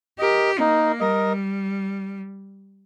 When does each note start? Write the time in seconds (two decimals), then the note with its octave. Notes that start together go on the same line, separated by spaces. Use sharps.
0.19 G4 A#4 D#5
0.59 A#3 D#4
1.00 G3 A#4 D#5